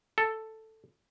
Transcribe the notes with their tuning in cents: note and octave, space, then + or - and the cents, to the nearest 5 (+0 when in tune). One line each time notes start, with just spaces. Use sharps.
A4 +5